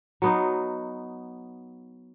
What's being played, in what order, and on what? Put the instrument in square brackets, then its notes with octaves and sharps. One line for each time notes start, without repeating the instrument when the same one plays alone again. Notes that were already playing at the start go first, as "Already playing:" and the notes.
[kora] F#3 B3 D#4